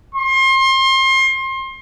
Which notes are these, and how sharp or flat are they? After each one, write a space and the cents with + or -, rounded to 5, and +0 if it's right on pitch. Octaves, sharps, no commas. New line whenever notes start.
C6 +30